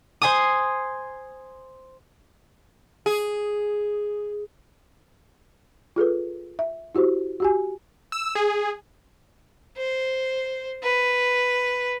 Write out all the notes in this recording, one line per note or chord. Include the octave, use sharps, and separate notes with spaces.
C5 G#5 D#6
G#4
F4 G#4 A4 B4
E5
E4 F#4 G4 C5
F#4 G4 G#5
E6
G#4
C5
B4